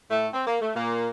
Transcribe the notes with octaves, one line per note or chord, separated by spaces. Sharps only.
A2 A3
C4
A#3
A3
A#2 A#3